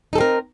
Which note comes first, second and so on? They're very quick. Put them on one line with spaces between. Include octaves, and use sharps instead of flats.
D#4 A4 C4 A#4